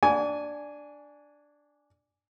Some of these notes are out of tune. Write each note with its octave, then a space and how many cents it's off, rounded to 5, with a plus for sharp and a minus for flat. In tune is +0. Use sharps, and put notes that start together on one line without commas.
D4 +0 G#5 +0 D6 -45